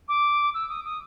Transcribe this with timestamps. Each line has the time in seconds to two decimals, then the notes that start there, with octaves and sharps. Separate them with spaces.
0.08 D6
0.54 E6
0.69 D#6
0.84 D#6